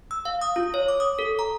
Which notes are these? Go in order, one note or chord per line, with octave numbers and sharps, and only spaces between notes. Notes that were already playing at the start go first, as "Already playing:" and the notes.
E6
F5
D#6
F4
C#5
D6
D#6
A4
A#5